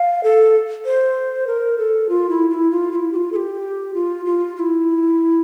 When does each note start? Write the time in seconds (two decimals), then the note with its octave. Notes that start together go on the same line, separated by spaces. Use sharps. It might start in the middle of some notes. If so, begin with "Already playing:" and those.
Already playing: F5
0.23 A4
0.85 C5
1.47 A#4
1.78 A4
2.09 F4
2.29 E4
2.50 F4
2.53 E4
2.71 F4
2.92 F4
2.95 E4
3.12 G4
3.16 F4
3.32 A4
3.36 G4
3.94 F4
4.25 F4
4.56 F4
4.59 E4